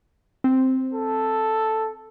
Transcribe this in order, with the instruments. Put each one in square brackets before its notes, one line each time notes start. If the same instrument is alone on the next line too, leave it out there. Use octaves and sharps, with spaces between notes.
[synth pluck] C4
[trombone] A4